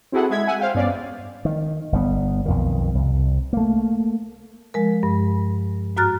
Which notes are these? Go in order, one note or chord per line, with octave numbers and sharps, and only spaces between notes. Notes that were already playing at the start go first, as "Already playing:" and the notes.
C4 E4 F#4 G#4 A4 F#5
G#3 E4 G#6 B6
E5 F#5 G#5
C5 F5 G5
G2 B3 C#4 D5 F5
D#3
G1 G3 B3
B1 F2 D#3
C2
A3 A#3
F3 G#3 A#4
G2
G#2 F#4 A#5 F6 F#6 A6